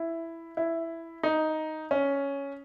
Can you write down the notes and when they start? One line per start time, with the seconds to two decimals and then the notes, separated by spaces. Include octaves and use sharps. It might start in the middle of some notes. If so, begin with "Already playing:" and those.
Already playing: E4
0.57 E4
1.23 D#4
1.91 C#4